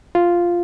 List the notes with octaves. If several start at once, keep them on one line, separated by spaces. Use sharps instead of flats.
F4